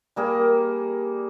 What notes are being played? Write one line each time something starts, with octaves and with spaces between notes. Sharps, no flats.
G3 A#3 G#4